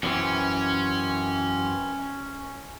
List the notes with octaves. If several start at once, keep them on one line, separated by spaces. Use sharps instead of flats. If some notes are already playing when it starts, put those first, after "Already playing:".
F#2 E3 C4 C#4